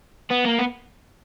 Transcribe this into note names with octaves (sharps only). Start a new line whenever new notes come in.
B3
A#3
B3